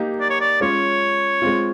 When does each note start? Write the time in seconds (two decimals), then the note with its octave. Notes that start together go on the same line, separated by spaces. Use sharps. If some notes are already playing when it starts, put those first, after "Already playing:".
Already playing: A#3 D#4 G4
0.21 D5
0.30 C#5
0.40 D5
0.60 G#3 C#4 F4 C#5
1.42 G#3 C4 F4